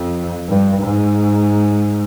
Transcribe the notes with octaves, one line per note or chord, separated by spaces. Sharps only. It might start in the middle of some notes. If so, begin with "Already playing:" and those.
Already playing: F2
G2
G#2